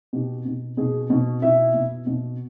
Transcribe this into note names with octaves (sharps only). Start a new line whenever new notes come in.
B2 G4
B2
B2 G#4
B2
B2 E4 E5
B2
B2